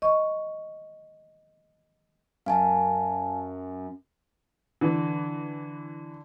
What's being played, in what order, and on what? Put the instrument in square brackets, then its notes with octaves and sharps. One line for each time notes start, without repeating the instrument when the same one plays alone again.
[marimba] D#5 C#6
[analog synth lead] F#2 [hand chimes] F5 G#5 A5
[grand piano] D3 [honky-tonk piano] E3